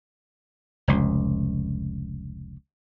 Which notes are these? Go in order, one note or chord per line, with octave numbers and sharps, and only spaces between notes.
F1 C#2